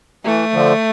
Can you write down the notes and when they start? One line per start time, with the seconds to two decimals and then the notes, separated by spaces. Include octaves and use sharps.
0.25 E3 A3
0.53 D3 F3